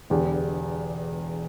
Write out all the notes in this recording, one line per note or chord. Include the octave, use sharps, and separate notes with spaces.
E1 E2 D3 G4